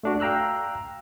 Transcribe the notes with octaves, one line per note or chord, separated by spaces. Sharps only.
A3 D4 F#4
F5 G5 A#5 E6 F#6